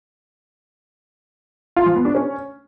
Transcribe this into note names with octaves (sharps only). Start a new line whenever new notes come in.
F4
F3
B3
D4
C#4